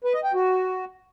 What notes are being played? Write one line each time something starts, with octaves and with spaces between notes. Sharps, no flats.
B4
D#5
G5
F#4